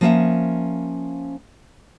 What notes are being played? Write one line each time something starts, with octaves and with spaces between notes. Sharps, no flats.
F3 A#3 C#4 C5 E5 F#5